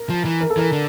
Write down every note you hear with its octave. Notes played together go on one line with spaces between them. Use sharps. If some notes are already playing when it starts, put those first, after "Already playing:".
Already playing: A#4
F3
E3
A#4
A4
E3 A#4
D3